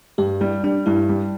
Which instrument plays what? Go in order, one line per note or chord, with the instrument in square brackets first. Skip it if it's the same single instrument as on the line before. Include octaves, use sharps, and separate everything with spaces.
[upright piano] G2 [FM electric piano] G4
[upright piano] G3 [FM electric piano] E4
[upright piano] G3 [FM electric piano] D4
[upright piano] G2 [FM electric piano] E4
[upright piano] G3